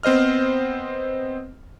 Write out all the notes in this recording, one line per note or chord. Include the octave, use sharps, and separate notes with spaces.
B3 C4 C5 D#5 F6